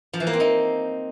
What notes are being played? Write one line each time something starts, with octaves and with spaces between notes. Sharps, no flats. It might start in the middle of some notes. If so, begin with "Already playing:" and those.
F3
E3
A#3
C4
D#4